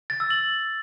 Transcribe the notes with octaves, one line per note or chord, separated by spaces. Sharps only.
A6
E6
F#7